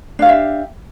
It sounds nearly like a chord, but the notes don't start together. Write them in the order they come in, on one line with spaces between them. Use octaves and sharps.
D4 F5 G4 E5